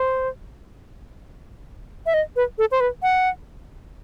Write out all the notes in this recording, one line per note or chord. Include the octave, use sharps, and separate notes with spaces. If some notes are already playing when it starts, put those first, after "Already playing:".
Already playing: C5
E5
D#5
B4
A4
C5
B4
F#5